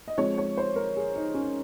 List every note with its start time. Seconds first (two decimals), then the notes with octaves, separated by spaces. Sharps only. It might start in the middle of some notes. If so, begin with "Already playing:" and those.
0.08 D#5
0.18 F3 G#3 C4 C#5
0.38 C#5
0.57 C5
0.76 A#4
0.97 G#4
1.15 D#4
1.34 C#4